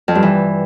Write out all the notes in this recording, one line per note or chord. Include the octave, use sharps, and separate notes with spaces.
F2
G2
E3